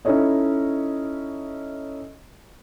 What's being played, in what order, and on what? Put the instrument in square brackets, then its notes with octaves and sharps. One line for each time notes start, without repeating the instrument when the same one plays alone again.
[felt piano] C#4 D#4 E4 A4 C#5 D#5